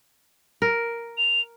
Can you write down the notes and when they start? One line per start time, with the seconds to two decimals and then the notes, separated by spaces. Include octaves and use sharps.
0.62 A#4
1.17 F7